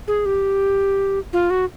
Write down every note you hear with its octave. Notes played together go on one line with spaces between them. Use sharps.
G#4
G4
F4
F#4